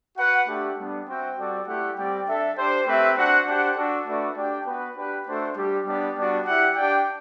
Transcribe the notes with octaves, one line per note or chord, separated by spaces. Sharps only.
F#4 B4 F#5
A3 D4 G4
G3 B3 D4
C4 F#4 C5 E5 G5
G3 C4 F#4 A4 D5
A3 E4 G4 D5 F#5
G3 C4 G4 D5 G5
D4 A4 E5
D4 G4 C5
A3 C4 G4 B4 E5
D4 F#4 C5 F#5
D4 G4 C5 F#5
D4 F#4 A4
A3 D4 F#4 B4 D5
D4 G4 D5 G5
B3 F#4 B4
D4 G4 B4
A3 D4 F#4 A4 C5
G3 D4 G4
G3 B3 D4 G4 D5
G3 B3 D4 F#4
E4 G4 D5 F#5
D4 G4 D5 G5